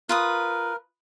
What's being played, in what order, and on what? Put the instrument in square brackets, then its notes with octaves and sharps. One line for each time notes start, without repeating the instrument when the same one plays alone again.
[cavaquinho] F4 B4 D#6 [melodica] A#4